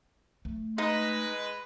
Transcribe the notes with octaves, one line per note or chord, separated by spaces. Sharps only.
A3
G#3 D#4 B4